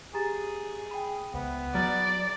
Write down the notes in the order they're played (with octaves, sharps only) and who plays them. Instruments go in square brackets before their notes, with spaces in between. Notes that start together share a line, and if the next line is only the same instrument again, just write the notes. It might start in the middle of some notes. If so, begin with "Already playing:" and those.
[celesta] G4 A#5 A6 [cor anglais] G#4
[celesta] G5 B5
[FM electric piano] C#2 [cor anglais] B3
[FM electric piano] F#3 [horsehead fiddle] D5 [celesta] A#5